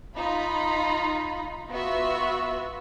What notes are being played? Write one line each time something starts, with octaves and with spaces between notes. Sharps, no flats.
D#4 F4 B5
B3 F4 F#4 E5